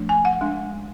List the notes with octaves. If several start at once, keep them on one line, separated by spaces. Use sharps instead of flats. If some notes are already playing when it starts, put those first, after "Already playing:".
Already playing: F3 A3 D4
G#5
F#5
G#3 D4